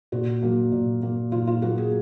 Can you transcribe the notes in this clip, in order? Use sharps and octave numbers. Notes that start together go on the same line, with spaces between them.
A#2 F#4
F#3 A#3
A#2
F#3 A#3
A#2 F4
F4
F#3 A#3 F#4
G#4